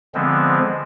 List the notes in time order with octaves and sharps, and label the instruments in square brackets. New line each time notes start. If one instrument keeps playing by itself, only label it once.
[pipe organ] D3 F3 G#3 B3 C4